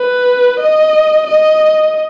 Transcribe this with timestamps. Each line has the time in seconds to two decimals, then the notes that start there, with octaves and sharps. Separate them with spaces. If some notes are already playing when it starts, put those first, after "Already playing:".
Already playing: B4
0.60 D#5
1.27 D#5